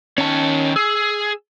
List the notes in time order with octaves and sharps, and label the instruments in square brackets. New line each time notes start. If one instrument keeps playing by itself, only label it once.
[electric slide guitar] D#3 C#5 [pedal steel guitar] C#4 A5
[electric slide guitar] G#4 [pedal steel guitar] E6